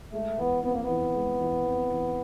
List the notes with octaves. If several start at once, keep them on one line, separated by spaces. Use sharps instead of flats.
G#3 A3
E3 B3
B3 C4
A#3
B3
E3
G#3
E3
C4
E3